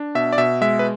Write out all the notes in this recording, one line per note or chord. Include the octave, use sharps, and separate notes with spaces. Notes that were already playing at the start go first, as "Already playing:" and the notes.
Already playing: D4
B2 E5
D5
B2 E5
G#3 E5
B4